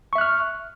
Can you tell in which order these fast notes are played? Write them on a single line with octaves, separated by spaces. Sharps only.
C#6 E5 F#6 F6